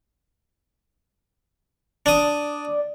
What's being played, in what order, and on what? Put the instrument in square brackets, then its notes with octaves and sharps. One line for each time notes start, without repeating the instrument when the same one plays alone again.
[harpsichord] D4 D#6 [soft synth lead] D5